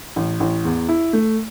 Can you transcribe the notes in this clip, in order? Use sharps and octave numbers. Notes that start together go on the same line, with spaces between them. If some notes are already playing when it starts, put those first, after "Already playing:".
A1
A1
E2
E4
A3